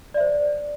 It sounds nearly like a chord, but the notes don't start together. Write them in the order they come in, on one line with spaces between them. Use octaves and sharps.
D5 E5 C5